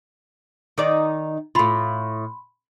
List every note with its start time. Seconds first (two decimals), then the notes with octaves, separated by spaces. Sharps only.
0.78 D#3 D#4 D5
1.55 A2 F4 B5 C6